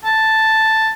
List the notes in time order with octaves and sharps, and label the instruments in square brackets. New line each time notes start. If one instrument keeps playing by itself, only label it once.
[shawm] A5